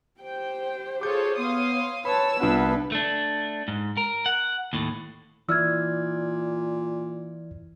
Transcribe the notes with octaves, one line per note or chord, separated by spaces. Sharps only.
G4 C5 G5
F4 G#4 A4 C#5 D6 G6
B3 C#5 F5 C6 D#6
B4 C#5 A5 B5 E6
C2 B3 D4 F4 B4 F#5
A3 D4
G#2
A#4
F#5
D#2 A2
A#2 E3 E4 D5 E6 F6 G#6